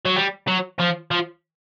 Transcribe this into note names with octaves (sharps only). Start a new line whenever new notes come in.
F#3
G3
F#3
F3
F3